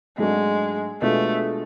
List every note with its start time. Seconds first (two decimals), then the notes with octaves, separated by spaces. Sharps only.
0.18 G#2 F#3 G#3 A3 D4 F#4
1.02 B2 G#3 A3 D4 F4